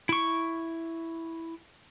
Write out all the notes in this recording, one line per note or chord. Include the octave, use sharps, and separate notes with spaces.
E4 C#6